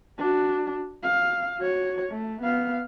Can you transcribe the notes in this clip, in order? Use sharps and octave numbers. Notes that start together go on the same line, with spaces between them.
D4 F#4
F5
F#4 C#5
A3
B3 F5